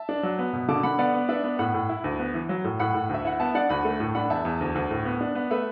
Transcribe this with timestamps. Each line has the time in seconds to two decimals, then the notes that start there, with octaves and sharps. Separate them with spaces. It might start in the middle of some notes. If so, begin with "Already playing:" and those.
Already playing: E5 A5
0.09 D4
0.23 F#3
0.39 B3
0.53 B2
0.68 D3 A5 D6
0.83 D3 F#5 B5
0.99 B3 D5 F#5
1.14 B3
1.29 D4 B4 E5
1.44 B3
1.59 A2 F#5 B5
1.74 A2
1.89 E4
2.04 D2
2.19 B3
2.34 E3
2.49 F#3
2.64 A2
2.79 A2 F#5 B5
2.94 A2
3.09 D2 E5
3.25 E4 F#5
3.39 B3 E5 A5
3.55 D4 D5 F#5
3.69 D2 F#5 B5
3.85 A3
4.00 A2
4.15 D4 F#5 B5
4.30 E2 E5 A5
4.45 E2
4.61 D2
4.75 D2
4.91 A2
5.05 B3
5.21 D4
5.35 B3
5.51 A3 B4 E5